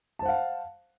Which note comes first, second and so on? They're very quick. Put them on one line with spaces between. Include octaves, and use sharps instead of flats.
A5 C5 F#5 F5